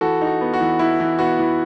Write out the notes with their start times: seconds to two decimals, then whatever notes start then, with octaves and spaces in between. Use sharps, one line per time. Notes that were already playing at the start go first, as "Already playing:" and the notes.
0.01 E3 F#4 A4
0.21 D#4
0.27 F#4
0.41 B3
0.54 F#4
0.61 E3
0.79 E3 E4
1.00 E3
1.19 B3 F#4
1.39 E3